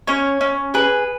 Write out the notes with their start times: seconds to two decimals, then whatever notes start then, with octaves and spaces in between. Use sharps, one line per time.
0.07 C#4 C#5
0.41 C#4
0.74 G#4 B4